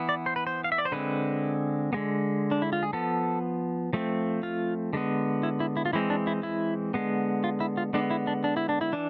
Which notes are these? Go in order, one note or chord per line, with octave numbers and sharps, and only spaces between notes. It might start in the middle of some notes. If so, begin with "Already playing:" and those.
Already playing: E3 B3
D5
C5
B4
C5
F5
E5
D5
C5
D3 G#3 C4 B4
D3 G#3 B3
D4
E4
F4
G#4
F3 B3 A4
F3 A3 C4
F4
D3 G#3 B3
E4
E4
E4
F4
E3 G#3 C4 E4
D4
E4
E4
D3 G#3 B3
F4
E4
F4
D3 G#3 B3 D4
E4
D4
D4
E4
D4
E4
E3 D4